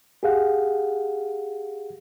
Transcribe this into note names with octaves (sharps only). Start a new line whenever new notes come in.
G4 G#4 F5 F#5